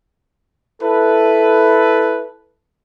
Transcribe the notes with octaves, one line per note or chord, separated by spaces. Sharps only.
E4 A4 B4